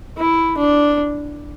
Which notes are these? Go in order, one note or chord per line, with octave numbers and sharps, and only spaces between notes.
E4
D4